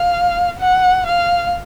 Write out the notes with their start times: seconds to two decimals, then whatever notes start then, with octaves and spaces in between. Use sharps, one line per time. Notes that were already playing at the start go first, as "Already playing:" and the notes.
Already playing: F5
0.59 F#5
1.06 F5